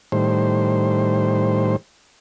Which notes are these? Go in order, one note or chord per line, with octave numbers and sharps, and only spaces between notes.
A2 D#3 G3 C5